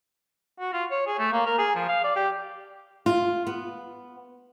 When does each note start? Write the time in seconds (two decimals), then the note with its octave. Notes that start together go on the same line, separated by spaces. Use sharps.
0.60 F#4
0.73 F4
0.90 C#5
1.07 G#4
1.19 A3
1.32 A#3
1.46 A#4
1.58 G#4
1.75 F3
1.88 F5
2.04 D5
2.16 G4
3.06 F4
3.47 B3